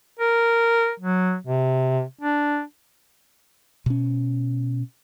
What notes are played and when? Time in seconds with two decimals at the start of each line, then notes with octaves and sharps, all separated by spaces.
0.19 A#4
1.00 F#3
1.47 C3
2.21 D4
3.86 B2 C#4